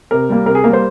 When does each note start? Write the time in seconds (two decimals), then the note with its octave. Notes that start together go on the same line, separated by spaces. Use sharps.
0.11 C3 A#4
0.30 G3 A#3
0.46 C3 A#4
0.55 G#4
0.64 G3 A#3 A#4
0.73 C5